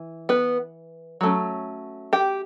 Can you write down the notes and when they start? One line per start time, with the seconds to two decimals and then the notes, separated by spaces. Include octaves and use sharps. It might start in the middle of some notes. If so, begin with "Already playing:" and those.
Already playing: E3
0.29 B3 B4
1.21 F#3 A3 C#4
2.13 G4 G5